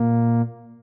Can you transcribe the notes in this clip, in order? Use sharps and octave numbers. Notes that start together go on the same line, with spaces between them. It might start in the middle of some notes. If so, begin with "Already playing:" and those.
Already playing: A#2 A#3